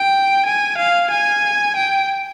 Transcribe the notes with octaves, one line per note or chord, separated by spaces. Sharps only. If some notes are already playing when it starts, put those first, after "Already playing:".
Already playing: G5
G#5
F5
G#5
G5